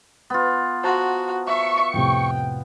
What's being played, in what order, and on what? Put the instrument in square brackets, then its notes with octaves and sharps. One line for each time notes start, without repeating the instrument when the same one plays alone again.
[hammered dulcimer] B3 F4
[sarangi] F#4 [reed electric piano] C5 A5 A#5
[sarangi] E5 [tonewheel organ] C#6
[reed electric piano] F2 A2 C3 [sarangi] G5